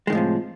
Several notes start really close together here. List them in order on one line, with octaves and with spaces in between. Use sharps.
G#3 D#3 A2 F3 C3